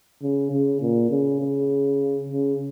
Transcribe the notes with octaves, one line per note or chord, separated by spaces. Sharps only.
C#3
C#3
A#2
C#3
C#3
C#3